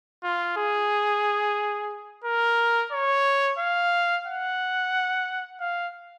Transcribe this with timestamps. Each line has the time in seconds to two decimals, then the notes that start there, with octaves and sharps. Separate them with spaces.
0.23 F4
0.57 G#4
2.25 A#4
2.92 C#5
3.58 F5
4.27 F#5
5.60 F5